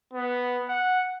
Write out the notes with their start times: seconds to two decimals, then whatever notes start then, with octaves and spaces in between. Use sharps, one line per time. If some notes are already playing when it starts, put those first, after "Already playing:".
0.13 B3
0.69 F#5